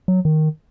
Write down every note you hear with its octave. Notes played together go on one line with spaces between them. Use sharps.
F#3
D#3